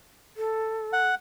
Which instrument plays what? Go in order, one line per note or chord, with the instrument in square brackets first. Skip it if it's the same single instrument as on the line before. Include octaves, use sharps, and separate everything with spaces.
[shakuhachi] A4
[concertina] F#5